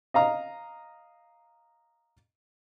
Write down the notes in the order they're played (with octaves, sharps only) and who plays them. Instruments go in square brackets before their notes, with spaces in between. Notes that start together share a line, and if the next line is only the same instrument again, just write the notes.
[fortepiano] D#5 F5 A#5